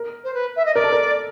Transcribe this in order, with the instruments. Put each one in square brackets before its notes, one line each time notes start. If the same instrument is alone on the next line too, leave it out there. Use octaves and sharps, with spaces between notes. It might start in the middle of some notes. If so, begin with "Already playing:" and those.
Already playing: [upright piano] A#4
[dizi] C5
B4
E5
D#5
[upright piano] A#4 [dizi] D5
[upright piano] A4
A#4